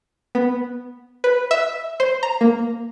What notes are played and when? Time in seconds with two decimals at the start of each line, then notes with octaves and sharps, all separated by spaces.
0.35 B3
1.24 B4
1.51 E5
2.00 C5
2.23 A#5
2.41 A#3